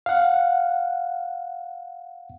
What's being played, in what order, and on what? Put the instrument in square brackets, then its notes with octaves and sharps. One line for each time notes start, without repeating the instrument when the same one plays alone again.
[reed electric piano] F5 F#5